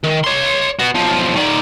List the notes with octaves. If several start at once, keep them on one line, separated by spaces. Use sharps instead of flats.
D#3
C#5 C6
B3 F#4
B1 F3
D#3 D5